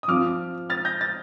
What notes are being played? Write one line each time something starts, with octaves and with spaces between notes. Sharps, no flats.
D#6
F3 C4 F4 D6 F6
F6 A6
G6 A#6
A6